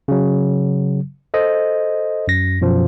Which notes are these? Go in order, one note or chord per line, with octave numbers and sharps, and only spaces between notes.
C#3 F#3
A4 C5 D#5
F#2 A#6
F#2 B2 F3